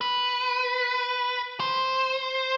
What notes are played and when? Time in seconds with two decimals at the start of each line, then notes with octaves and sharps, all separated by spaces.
0.01 B4
1.60 C5